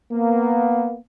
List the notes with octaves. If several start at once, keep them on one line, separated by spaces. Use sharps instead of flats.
A#3 B3